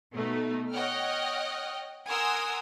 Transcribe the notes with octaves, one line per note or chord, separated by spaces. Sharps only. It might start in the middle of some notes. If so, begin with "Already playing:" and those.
B2 A3 D#4
C#5 D#5 F#5 G5 F6
A#4 F#5 G#5 C6 D#6 E6